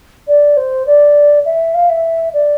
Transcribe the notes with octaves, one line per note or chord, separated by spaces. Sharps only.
D5
C5
D5
E5
F5
E5
D5